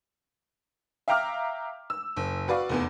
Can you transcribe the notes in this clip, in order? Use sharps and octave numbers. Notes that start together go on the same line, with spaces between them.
E5 F5 G5 A#5 D6 F6
E6
F#1
F#4 B4 D5 F5 C#6
F1 E2 B3